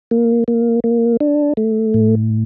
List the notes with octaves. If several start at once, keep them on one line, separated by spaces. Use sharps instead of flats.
A#3
A#3
A#3
D4
A3
A2